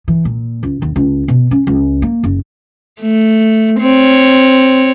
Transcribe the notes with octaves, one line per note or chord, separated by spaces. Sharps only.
E3
A#2
C#2
D#2
C#2
B2
C#4
C#2
A#3
F#1
A3
C4 C#5